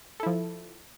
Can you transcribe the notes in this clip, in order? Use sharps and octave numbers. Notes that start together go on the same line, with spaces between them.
F3 E4 A4